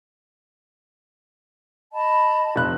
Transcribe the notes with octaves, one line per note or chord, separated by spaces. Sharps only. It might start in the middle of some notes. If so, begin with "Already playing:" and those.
D#5 A5 B5
F1 F#6